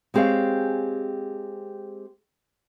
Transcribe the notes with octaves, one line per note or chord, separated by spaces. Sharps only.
G#3 C4 G4 G#4 C#5 F5